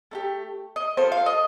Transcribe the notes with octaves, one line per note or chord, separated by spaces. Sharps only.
A3 D#4 G4
D#5
C4 F4 A4 C5
F5
D#5